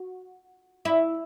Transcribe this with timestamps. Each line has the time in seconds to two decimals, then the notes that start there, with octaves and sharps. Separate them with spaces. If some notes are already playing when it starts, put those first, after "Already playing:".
Already playing: F#4
0.85 E4